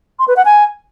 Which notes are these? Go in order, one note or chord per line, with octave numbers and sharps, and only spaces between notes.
C6
B4
F#5
G#5